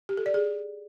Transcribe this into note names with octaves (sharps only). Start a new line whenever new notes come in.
G4
A4
D5
G#4